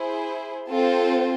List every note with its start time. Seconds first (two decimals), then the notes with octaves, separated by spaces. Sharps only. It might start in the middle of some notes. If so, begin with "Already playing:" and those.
Already playing: E4 G#4 C5
0.70 C4 F4 A4 C5